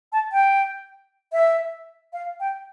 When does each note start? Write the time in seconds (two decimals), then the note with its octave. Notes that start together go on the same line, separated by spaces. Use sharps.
0.12 A5
0.32 G5
1.33 E5
2.13 F5
2.40 G5